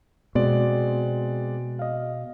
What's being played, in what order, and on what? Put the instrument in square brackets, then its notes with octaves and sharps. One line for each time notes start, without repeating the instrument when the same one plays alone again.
[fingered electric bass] B2 [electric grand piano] G#3 C4 D5
[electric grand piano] D#5 F5